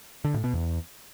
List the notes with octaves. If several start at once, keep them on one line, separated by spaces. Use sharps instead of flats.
D3
A2
B2
E2